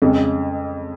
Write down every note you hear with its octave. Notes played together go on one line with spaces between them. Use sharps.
F2 C#3 G#3